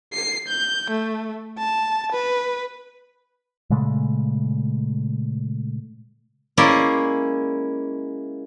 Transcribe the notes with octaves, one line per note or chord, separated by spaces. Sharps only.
C7
G6
A3
A5
B4
A#2 C#3 G#3 A3
G#3 A#3 C#4 E4 D5